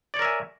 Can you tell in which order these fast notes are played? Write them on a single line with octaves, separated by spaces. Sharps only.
D5 C#5 A#4 E5 G#5